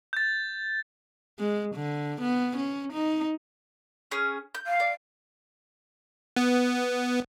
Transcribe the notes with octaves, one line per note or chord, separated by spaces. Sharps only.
G6 A6
G#3
D3
B3
C#4
D#4
C#4 G#4
G6
F5
D5
B3